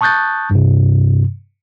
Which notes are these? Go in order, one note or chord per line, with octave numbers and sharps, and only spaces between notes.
A5 C#6 D#6 F#6 G6 A6
G2 C3